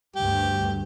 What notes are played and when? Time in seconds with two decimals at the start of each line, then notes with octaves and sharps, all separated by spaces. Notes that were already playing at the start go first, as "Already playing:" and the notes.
0.16 D2 G2 G4